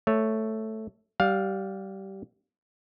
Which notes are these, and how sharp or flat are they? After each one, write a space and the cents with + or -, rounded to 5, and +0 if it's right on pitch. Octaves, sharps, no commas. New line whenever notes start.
A3 +0 C#5 +0
G3 -20 F5 +15